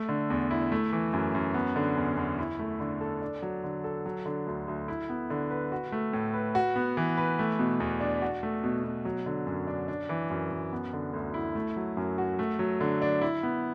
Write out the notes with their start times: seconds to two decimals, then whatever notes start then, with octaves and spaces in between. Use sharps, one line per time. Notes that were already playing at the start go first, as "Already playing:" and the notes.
Already playing: A3
0.09 D3
0.30 E2
0.51 E4
0.72 A3
0.92 E3
1.13 F#2
1.35 F#2
1.54 B3
1.76 D3
1.97 E2
2.17 E2
2.38 E4
2.59 A3
2.80 D3
3.01 A4
3.22 D4
3.42 F#3
3.64 D3
3.84 A4
4.06 F#3
4.25 D3
4.47 D2
4.68 D2
4.88 E4
5.09 B3
5.30 D3
5.51 B4
5.72 F#4
5.92 A3
6.13 A2
6.34 B4
6.55 F#4
6.76 B3
6.97 E3
7.17 B4
7.39 A3
7.59 B2
7.80 E2
8.00 D4
8.22 F#4
8.43 A3
8.64 B2
8.84 B2
9.05 F#3
9.26 D3
9.47 F#2
9.67 D4
9.88 D4
10.09 E3
10.30 F#2
10.51 F#2
10.73 B3
10.93 D3
11.13 D2
11.34 E4
11.55 A3
11.77 F#3
11.97 F#2
12.18 F#4
12.39 A3
12.59 F#3
12.81 D3
13.02 D4
13.21 E4
13.43 B3